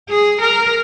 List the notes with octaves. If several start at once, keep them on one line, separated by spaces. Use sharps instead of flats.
G#4
A#4